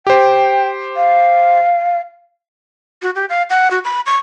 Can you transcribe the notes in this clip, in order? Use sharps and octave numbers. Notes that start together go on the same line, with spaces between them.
G4 C5 G5
F5
F#4
G4
F5
F#5
F#4
B5
C#6